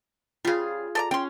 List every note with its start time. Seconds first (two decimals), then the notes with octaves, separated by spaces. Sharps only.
0.45 C#3 G3 F4 G#4
0.95 A4 D5 A#5
1.11 C#4 G5 C6